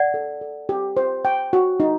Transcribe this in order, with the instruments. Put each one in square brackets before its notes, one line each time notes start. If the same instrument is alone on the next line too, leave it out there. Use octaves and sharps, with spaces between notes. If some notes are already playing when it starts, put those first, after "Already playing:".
Already playing: [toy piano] D5 F#5
[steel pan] A4
A4
G4
C5
G5
F#4
D#4